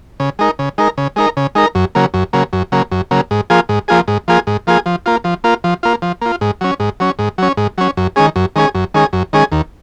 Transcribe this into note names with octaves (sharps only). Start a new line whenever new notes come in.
C#3
G#3 D#4 A#4
C#3
G#3 D#4 A#4
C#3
G#3 D#4 A#4
C#3
G#3 D#4 A#4
F#2
C#3 F#3 A#3
F#2
C#3 F#3 A#3
F#2
C#3 F#3 A#3
F#2
C#3 F#3 A#3
G#2
F3 A#3 F4 G#4
G#2
F3 A#3 F4 G#4
G#2
F3 A#3 F4 G#4
G#2
F3 A#3 F4 G#4
F3
A#3 F4
F3
A#3 F4
F3
A#3 F4
F3
A#3 F4
G#2
F#3 C#4
G#2
F#3 C#4
G#2
F#3 C#4
G#2
F#3 C#4
F#2
D#3 G#3 C#4 G#4
F#2
D#3 G#3 C#4 G#4
F#2
D#3 G#3 C#4 G#4
F#2
D#3 G#3 C#4 G#4
D#2